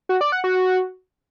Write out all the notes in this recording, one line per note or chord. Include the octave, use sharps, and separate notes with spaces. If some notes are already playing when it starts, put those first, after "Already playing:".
F#4
D5
F#5
F#4